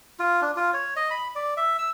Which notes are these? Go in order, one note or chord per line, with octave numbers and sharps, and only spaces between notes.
F4
D4
F4
C#5
D#5
B5
D5
E5
E6